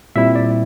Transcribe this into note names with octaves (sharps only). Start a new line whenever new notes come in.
A#2 G3 C4 E4 E5
D5